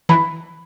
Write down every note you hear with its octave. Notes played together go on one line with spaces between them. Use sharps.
E3 B5